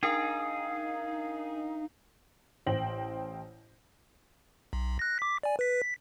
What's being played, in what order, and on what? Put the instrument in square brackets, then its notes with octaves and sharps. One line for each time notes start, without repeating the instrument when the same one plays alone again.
[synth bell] D4 A#4 G5 [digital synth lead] D#4 [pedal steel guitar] G#4 [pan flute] F5
[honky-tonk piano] A1 C5 G5 A#6 F#7
[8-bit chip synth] B1
F#6 A#6
D6 B6
D5 G#5
B4 B6
B6